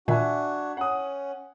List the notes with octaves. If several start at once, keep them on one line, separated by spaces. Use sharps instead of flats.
A#2 D#3 D4 F#4 E5 F#5 G#5
C#4 F#5 D#6